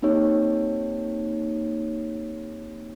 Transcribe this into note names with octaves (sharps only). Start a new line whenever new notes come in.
A#3 C4 D#4 G4 C#5